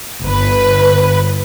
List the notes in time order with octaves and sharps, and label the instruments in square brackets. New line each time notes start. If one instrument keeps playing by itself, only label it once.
[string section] G1 B4